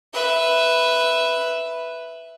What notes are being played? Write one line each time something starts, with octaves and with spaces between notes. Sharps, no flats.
B4 E5